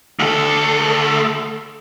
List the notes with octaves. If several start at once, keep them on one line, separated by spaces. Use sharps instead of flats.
D2 A4